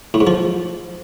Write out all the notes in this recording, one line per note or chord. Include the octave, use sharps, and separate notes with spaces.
A2
G#2
F3